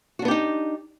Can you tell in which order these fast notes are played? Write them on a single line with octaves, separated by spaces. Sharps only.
F#4 D4 B3 G4 D#4